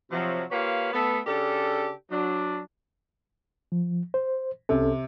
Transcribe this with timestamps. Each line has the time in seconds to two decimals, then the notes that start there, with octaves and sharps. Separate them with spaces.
0.12 C3 F3 F#3
0.51 A#3 F4 G4 B4 C#5 F5
0.94 A3 B3 A4
1.27 C#3 D4 G4 A4
2.11 F#3 D4
3.72 F3
4.14 C5
4.69 C2 C3 C#4 A4